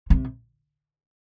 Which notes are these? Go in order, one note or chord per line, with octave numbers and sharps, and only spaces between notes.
C3